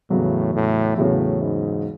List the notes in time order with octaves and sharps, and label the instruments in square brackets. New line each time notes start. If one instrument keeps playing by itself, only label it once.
[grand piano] E2 C#3 F#3 B3 [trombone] A2
[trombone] A2
[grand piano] E2 C#3 F#3 B3 [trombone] A2
[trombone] G#2